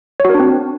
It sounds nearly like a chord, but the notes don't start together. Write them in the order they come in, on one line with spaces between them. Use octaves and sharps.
C#5 F#4 A#4 D4 C4